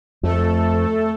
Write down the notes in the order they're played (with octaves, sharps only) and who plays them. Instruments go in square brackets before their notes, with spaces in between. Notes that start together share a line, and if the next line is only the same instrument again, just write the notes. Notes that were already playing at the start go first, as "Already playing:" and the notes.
[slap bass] F2 [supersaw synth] A3 A4